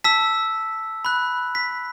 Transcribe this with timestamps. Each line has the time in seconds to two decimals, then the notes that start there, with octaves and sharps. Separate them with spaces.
0.04 A5 E6 B6
1.05 B5 F#6
1.55 B6